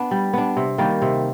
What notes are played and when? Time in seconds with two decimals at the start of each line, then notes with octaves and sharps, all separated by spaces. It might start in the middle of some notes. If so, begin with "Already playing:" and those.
Already playing: B3 D4
0.11 G3
0.33 B3 D4
0.56 C3
0.78 D#3 G3 A#3
1.02 C3